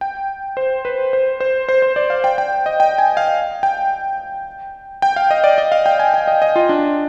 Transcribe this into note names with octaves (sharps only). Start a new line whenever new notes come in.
G5
C5
B4
C5
C5
C5
C5
D5
F5
G5
G5
D#5
G5
G#5
F5
G5
G5
F5
D#5
D5
D#5
F5
G5
G#5
G5
D#5
D#5
F4
D4